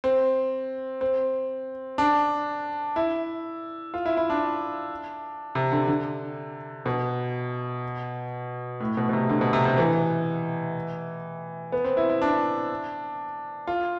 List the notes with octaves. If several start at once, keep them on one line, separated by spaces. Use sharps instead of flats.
C4
C4
D4
E4
F4
E4
E4
D4
C3
D3
D3
B2
A2
B2
B2
C3
D3
B2
C3
C3
E3
B3
C4
E4
E4
D4
F4